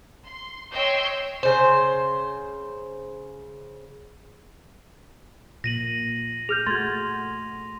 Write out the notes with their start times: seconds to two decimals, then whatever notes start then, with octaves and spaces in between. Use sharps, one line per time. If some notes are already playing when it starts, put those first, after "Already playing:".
0.24 C6
0.73 C#5 D#5 G5 C6 E6 G6
1.43 C#3 C5
5.64 A#2 A#6 D#7 F#7
6.49 G#4 F6 G6 F7
6.67 A3 F#4 C6 G#6 A6